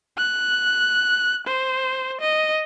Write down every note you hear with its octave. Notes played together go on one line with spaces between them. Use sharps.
F#6
C5
D#5